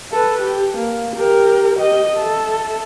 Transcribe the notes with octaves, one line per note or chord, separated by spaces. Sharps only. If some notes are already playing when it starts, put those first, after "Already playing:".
A4 B4
G4
A#3
G4 A#4
G4 D#5
A4 E5